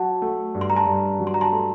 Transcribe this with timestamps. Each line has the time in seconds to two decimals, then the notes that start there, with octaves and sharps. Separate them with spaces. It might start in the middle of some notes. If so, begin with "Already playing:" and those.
Already playing: F#3 F#5 A5
0.22 A3
0.54 G2
0.61 C6
0.70 A#5
0.76 A5 C6
0.87 G2
1.19 F#3
1.27 C6
1.34 A#5
1.41 A5 C6
1.52 A3